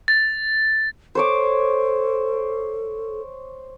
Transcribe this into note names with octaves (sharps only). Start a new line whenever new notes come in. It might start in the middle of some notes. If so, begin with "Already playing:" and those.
A6
A4 C5 C#5 D6